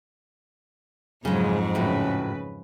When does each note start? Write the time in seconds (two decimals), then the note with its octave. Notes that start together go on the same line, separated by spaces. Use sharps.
1.25 F2 G#2 C#3 F#3 G#3
1.75 A2 C#3 F#3 A3 B4